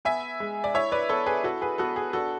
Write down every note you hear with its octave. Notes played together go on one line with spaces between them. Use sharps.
B3 E5 G#5
G#3
D5
E4 C#5 E5
B4 D5
B3 A4 C#5
G#4 B4
E4 F#4 A4
G#4 B4
B3 F#4 A4
G#4
D4 F#4 A4